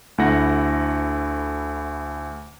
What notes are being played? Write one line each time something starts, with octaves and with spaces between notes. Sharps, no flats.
D2 A3 E4 F#5 A#6